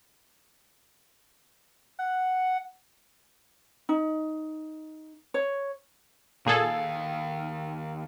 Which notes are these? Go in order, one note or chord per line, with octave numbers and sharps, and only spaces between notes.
F#5
D#4
C#5
D#2 A#2 G#4 A4 F5